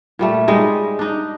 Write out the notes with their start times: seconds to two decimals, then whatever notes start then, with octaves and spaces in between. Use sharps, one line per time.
0.19 A#2 G3 A3
0.48 G3 G#3 D#4
0.99 D4 D#4